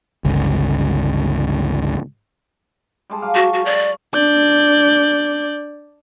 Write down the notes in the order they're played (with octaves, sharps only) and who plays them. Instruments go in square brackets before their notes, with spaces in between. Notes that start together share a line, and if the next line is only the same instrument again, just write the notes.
[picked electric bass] G1 C#2
[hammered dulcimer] G3 G#3 A5
F#3 F5 D6
[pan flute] F#4 [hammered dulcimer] C#6
[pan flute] F#4
D5
[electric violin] D4 G6 [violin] D5